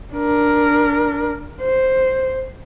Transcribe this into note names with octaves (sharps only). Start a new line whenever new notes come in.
D4 A#4
C5